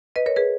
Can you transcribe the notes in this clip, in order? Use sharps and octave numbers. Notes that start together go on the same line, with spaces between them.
B4 D#5
A#4 C#5
G#4 B4